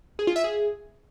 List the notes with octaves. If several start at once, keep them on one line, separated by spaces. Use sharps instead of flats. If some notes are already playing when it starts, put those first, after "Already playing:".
G#4
F4
E5
G#4